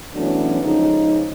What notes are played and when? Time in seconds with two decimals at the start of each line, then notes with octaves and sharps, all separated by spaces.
0.15 E3 F#3 A3 B3 C#4 D4
0.62 C#3 F3 G#3 D#4